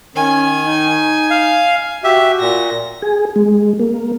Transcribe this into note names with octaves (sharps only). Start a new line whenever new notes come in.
D#3 C#4 G#5
D#4
F5
F#4 G4 E5
A#2 A#6
G#4
G#3
A#3